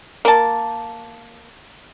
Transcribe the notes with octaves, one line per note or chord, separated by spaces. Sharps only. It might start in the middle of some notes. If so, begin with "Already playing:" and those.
A#3 A5